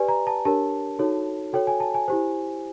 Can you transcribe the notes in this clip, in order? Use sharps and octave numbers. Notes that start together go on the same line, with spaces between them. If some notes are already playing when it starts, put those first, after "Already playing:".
Already playing: G4 B4 D5 G#5
A#5
A5
D4 G4 A#4 C#5 A5
D#4 F#4 A4 C#5
F#4 A4 C#5 G5
G#5
A5
G#5
E4 G4 C5